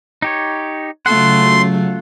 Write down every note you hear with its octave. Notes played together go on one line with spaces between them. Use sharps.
D#4 G4 C#5
C#3 F#3 A3 F4 F#5 C6